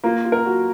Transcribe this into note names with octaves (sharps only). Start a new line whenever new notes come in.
A#3 F4
F4
A#4
F#4